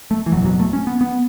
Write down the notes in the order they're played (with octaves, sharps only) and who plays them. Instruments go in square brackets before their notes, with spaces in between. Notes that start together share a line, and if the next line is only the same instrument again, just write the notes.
[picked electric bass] A3
E3
F#1 E2 B2 F#3
F#3
A3
C#4
B3
B3